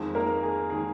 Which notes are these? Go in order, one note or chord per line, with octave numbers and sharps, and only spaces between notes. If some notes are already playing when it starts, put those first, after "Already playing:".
Already playing: F2 D#3 G#3
A#3 A#4
G#4
D#3 G#3 G#4